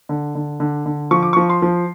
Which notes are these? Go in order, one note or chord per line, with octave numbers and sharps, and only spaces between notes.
D3
D3
D3
D3
F3 C#6
D6
F3 C#6
C6
F3